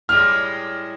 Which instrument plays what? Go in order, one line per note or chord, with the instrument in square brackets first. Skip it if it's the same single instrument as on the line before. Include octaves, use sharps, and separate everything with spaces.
[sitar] A2 G3 G#3 [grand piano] F6